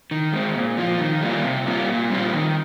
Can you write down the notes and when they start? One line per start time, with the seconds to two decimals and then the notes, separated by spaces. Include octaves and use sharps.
0.11 D#3
0.33 G#3 C4
0.55 A#2
0.78 F3 C4 F4
1.00 D#3
1.21 G3 A#3 F4
1.44 C3
1.66 G3 A#3 F4
1.89 A#2
2.10 G3 C4 F4
2.33 D#3